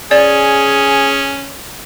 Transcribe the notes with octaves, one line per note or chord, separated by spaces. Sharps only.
C#4 G#4 D5